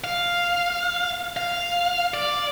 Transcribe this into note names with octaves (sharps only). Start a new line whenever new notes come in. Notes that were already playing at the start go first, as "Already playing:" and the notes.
F5
F5
D5